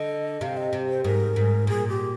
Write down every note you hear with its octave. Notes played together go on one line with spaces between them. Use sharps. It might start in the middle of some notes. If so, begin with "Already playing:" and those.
Already playing: D3 D#5
C3 F5
D#5
C3
C5
G#2 A#4
G#2
A#2 G#4
G4